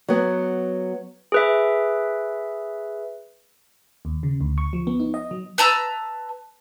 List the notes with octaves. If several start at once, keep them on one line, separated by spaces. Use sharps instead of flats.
F#3 B3
G#4 B4 E5
D#2
C#3
D2
C#6
F3
B3
D#4
D#5
F#3
B4 A5 A#5 E6